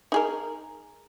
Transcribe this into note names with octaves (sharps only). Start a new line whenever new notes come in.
D#4 G#4 A#4